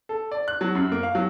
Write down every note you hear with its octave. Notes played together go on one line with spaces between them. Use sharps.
A4
D5
F#6
F#3
F#2
A#3
F5
F#3